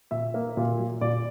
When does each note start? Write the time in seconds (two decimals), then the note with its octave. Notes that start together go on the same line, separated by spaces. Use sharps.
0.11 A#2 E5
0.34 A#3
0.57 A#2
0.79 F#3
1.01 A#2 D5